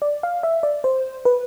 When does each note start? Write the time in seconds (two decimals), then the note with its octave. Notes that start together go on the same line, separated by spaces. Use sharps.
0.02 D5
0.23 F5
0.43 E5
0.63 D5
0.84 C5
1.25 B4